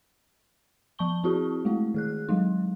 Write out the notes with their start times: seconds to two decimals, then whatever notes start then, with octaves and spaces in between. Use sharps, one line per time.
0.99 F3 A5 C#6 G7
1.24 C4 E4 F#4 G#4
1.65 G#3 A3 E4
1.94 D#3 G#4 F#6
2.29 F#3 G#3 D#4